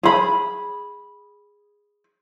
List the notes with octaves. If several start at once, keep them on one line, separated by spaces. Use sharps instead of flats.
G#4 B5